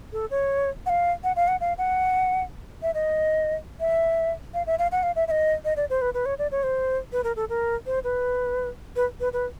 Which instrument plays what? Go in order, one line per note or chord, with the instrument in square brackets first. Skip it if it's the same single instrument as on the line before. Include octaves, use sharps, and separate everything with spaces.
[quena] A4
C#5
F#5
F5
F#5
F5
F#5
F5
F#5
E5
D#5
E5
F5
E5
F5
F#5
F5
E5
E5
D#5
D#5
D5
C5
B4
B4
C#5
D5
C#5
C5
B4
A#4
A4
A#4
C5
B4
B4
B4
B4